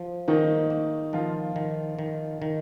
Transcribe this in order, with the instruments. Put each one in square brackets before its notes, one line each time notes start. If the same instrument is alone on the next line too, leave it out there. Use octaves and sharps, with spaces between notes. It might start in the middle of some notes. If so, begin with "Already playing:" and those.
Already playing: [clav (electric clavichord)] F3
[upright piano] D#3 D#4 [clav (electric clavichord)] A#3
[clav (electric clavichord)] A#3
[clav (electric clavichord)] D#3 [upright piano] F3 F4
[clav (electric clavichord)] D#3
D#3
D#3